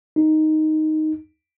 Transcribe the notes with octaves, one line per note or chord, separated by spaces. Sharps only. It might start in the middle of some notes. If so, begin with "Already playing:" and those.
D#4